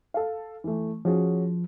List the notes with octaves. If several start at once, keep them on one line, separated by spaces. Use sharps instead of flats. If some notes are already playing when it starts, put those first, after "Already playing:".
A4 F5
E3 A3
F3 C#4 F#4 G#4